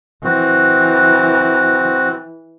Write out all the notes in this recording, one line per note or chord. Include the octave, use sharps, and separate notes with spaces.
E3 C4 F#4